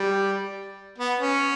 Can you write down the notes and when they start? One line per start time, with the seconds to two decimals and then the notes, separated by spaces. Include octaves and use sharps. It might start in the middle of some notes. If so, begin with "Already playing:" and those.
Already playing: G3
0.98 B3
1.19 C#4